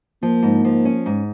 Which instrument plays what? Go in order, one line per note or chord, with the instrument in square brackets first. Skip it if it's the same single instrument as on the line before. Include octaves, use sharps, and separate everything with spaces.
[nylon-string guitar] F3 [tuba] A#3
[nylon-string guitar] G#2
F3
C#4
G#2